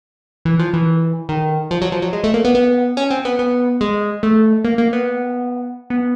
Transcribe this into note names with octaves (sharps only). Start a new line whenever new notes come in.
E3
F3
E3
D#3
F3
F#3
F3
F#3
G#3
A3
A#3
B3
B3
C#4
C4
B3
B3
G#3
A3
A#3
A#3
B3
B3